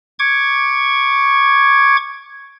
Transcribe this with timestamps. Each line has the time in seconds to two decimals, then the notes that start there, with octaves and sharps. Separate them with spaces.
0.19 C#6 D6 G#6